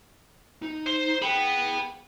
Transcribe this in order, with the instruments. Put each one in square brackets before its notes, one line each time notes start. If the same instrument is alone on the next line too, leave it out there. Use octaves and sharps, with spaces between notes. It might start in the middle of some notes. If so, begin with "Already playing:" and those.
[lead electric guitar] D#4
[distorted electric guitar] C5
[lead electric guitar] G#4 G5 [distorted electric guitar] F#5 B5